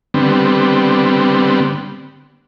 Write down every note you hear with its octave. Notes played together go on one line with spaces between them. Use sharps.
D3 G3 B3 C4